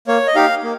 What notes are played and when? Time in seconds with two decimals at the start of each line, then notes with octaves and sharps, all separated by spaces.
0.08 A#3 C#5
0.27 D#5
0.35 D#4 G4 F5
0.63 A#3